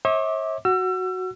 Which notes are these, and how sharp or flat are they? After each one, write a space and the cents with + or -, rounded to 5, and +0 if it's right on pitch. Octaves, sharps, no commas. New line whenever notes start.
C#5 -40 E5 -40 D6 +5
F#4 +0 E6 +35